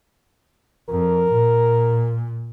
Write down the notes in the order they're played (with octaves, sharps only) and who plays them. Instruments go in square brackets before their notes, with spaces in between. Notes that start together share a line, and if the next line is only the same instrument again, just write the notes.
[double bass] F2 [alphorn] A#4
[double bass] A#2